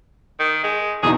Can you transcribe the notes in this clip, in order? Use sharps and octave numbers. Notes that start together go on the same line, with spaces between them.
D#3
G#3
E2 B2 D#4 G#4